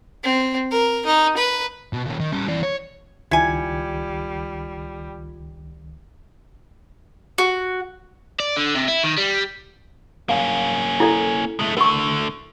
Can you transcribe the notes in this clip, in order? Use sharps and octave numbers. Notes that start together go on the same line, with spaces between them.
C4
A#4
D#4
B4
B2
D#2 C#4
D#3
G3 C#4
E3 D5
C#5
C#2 D#3 G3 E4 F4 G#5 G#6 C#7
F#4
D5
D3
C3
E4
D#3
G3
A#3 C#4 F5
E4 A4 D5
G#3 A3
D3 A3 A#4 C#6